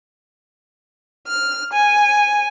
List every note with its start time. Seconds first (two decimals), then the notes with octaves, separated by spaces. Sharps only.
1.27 F6
1.73 G#5